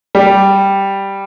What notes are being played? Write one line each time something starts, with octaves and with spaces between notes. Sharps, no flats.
G3